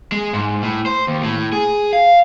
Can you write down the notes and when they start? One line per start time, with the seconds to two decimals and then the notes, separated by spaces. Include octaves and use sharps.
0.12 G#3
0.33 G#2
0.63 A2
0.86 C5
1.07 D#2
1.23 A2
1.52 G#4
1.93 F5